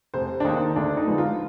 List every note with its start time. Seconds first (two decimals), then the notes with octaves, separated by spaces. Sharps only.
0.14 F1 C5
0.40 D4
0.45 D#2 D#3 D#4
0.76 D2 D4
0.97 D#4
1.07 D3 F3 G#3 B3
1.18 F4